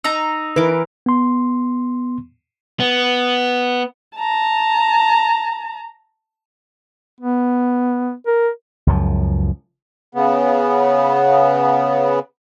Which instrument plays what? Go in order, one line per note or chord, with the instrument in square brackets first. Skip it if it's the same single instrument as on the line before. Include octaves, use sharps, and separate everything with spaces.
[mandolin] D#4 A#5 [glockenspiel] E6 F7
[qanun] E3 A#4 D6 [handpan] B4
[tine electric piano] B3 C6
[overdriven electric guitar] B3
[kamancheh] A5 A#5
[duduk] B3
A#4
[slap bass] C#2 F#2 F3
[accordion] C#3 B3